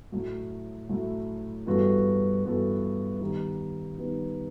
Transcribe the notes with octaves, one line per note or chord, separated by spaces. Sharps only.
A2 F#3 A3 E4
A2 F#3 A3 E4
G2 E3 B3 F#4 A4
G2 E3 B3 F#4 A4
D#3 G3 B3 D#4
D#3 G3 B3 D#4